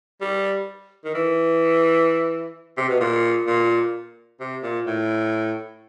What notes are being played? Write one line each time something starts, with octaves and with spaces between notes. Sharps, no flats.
G3
D#3
E3
C3
B2
A#2
A#2
C3
A#2
A2